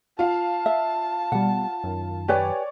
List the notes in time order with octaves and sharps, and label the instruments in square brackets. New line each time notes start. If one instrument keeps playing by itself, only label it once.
[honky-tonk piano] F4 F5 [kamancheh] A5
[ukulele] E5
[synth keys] B2 G3 [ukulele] F#5
[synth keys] F#2 D#3
[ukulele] G4 B4 G#5 [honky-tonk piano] C#5 D5